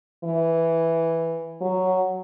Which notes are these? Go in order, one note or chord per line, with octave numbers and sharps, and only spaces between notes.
E3
F#3